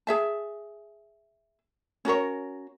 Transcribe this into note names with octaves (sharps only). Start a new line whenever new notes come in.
G#4 E5 A5
C#4 F#4 A#4 C#5